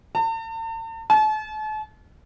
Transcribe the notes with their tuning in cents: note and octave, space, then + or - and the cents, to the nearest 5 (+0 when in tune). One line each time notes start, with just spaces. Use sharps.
A5 +45
A5 -40